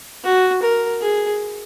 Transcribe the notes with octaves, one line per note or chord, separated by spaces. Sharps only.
F#4
A#4
G#4